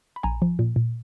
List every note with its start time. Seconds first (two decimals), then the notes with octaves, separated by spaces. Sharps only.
0.16 B5
0.23 A#1 G#5 A#5
0.42 F3
0.59 A#2
0.76 A#2